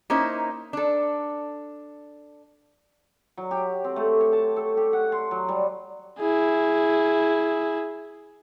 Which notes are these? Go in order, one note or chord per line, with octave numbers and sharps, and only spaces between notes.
A#3 C#4 D#4 E4 C5
D4 A4
F#3
G4
C4
A3
C#5
A5
A4
G4
F#5
C6
F#3
G3
E4 G#4